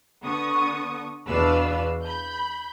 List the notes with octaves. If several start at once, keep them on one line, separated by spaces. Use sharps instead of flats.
D3 B3 C#6 D#6
E2 B2 D4 B4 F5 E6
B5 G6